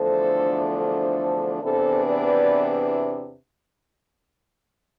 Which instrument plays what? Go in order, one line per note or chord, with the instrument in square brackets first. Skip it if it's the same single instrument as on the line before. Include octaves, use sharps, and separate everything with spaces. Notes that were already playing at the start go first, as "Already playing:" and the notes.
Already playing: [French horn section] E2 D3 F3 A3 D4 A4 C5
A4 C5
E2 C3 E3 B3 D4 A4 C5
B4 D5